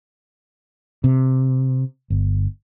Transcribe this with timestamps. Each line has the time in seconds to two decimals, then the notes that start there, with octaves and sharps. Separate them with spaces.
1.04 C3
2.10 G1